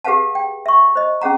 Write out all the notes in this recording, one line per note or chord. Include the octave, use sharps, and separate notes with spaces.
G4 G#4 B4 F5 F#5 A5
G5
E5 C#6
C5 D#5
C#4 G#4 F#5 A#5